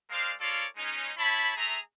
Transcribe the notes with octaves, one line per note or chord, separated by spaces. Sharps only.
G#3 A#4 C5 D5 F5
F4 A4 A#4 C#5 D5 F5
G#3 C#4 D#4
E4 C#5 A5 B5
A3 G#4 E5 A#5